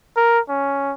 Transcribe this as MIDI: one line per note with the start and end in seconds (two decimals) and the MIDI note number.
0.17 0.40 70
0.49 0.94 61